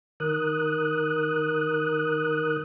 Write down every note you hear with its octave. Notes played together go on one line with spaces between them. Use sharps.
D#3 A#4 D#6 F#6